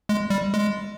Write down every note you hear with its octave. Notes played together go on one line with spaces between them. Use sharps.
G#3
G3
G#3